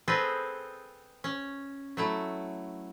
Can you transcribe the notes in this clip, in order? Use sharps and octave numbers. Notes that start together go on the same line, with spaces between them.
C4 G#4 A4 B4 D#5
C#4
F#3 A3 E4